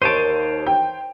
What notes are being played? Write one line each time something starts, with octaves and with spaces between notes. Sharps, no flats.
D#2 C5 C#5 A5 D7 D#7
G5